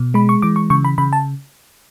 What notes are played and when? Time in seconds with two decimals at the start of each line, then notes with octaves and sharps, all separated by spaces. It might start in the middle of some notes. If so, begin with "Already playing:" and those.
Already playing: B2
0.14 G#3 B5
0.29 C#6
0.42 E3 D6
0.56 C#6
0.70 C#3 C#6
0.85 B5
0.98 C#3 B5
1.13 A5